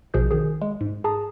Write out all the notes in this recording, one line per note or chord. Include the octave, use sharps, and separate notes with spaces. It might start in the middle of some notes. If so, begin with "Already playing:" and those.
A#1 B2 F3 G#4 G6
D#3 G#4
G#3
G#2
G#4 A5 A#5 D#6